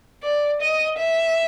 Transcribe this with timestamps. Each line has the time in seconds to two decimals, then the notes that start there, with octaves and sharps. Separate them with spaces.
0.23 D5
0.61 D#5
0.99 E5